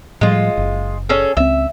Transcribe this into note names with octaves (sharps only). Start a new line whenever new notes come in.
A2 F3 G3 G#3 F4
F#1
C#4 G#4 A4
C#2 C4 E5